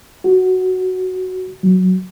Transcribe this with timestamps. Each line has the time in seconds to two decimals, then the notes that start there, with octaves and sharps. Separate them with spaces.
0.24 F#4
1.63 F#3